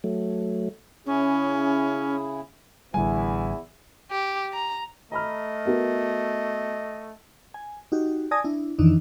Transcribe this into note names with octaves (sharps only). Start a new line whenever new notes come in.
F#3 A3
C#3 C#4 E4 G#4
A1 E2 D3 G3 B3 E4 G#5
G4
A#5
A3 D#5 A#5 B5 F6
B3 F#4 A#4
G#5
D#4 F#4 G4
D5 G#5 A5 D#6 G#6 A#6
D4 E4
F2 D#3 E3 D4 D#4